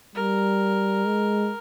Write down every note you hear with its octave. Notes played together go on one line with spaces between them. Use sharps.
G3 A#4
G#3